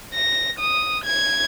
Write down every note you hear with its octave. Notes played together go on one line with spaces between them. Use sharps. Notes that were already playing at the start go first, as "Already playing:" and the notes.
A#6
D#6
G#6